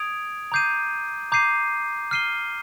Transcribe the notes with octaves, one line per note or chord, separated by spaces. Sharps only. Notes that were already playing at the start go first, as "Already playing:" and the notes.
Already playing: D#6 G#6 D7 F7
A#5 D6 G6 C7 D#7
A#5 D6 G6 C7 D#7
F6 C7 D#7 G7